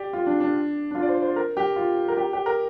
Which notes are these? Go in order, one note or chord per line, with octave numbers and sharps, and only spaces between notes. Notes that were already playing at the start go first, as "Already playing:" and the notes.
Already playing: G4 D5
F4
D4
D4
D4
F4
D5
C5
C5
A#4
G4
F4
A#4
G4
G4
A#4